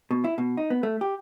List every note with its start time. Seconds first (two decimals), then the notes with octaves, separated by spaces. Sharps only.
0.11 B2
0.24 E4
0.38 B2
0.57 D#4
0.70 B3
0.83 A3
1.01 G4